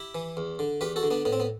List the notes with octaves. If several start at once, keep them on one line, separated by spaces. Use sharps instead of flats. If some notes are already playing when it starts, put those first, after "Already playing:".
Already playing: E4 G4
E3
E2
D3
E2 G4 B4
F#4 A4
D3
B3 D4
A2 B3
C4
B3